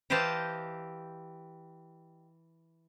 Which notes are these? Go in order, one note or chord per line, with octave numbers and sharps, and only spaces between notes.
E3 G4 C5 D#5 F5 A5